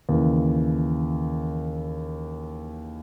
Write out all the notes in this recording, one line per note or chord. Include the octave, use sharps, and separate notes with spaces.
D#2 C#3 E3